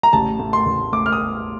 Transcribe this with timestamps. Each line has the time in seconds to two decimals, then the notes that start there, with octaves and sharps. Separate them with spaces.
0.03 A#5
0.13 A1 A5
0.39 A2
0.53 C6
0.66 A1
0.93 A2 D6
1.06 F6
1.12 D#6